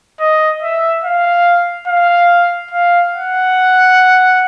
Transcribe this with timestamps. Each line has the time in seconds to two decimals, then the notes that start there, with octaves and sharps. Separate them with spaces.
0.21 D#5
0.62 E5
1.04 F5
1.87 F5
2.71 F5
3.13 F#5